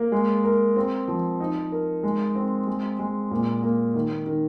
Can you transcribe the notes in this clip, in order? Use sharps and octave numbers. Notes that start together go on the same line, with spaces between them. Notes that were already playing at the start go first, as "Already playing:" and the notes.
Already playing: A#3
G#3
A#4
C4
F3
D#4
A#4
G#3
C4
G#3
G#3
A#2
A#3
D#3
D#3